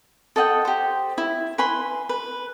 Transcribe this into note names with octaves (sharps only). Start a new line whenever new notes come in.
A4 D#5 F#5 G5
G4 C5
E4
B4 G#5 B5 C6
B4